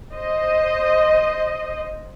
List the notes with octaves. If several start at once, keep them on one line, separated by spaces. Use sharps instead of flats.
C5 D#5